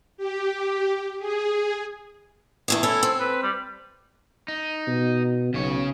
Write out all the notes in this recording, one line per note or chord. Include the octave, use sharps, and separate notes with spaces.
G4
G#4
E2 A3 G#4
C#4 E4 A4
C4
B4
G3
D#4
B2
B1 C#3 C#5